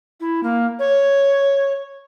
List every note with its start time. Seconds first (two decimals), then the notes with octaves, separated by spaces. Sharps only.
0.20 E4
0.43 A#3
0.79 C#5